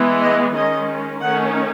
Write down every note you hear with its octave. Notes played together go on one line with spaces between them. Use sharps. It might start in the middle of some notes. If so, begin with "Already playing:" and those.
Already playing: E3 G#3 B3
D#5
D#3 G#3 C#4 D#5
D#3 A3 C#4 F#5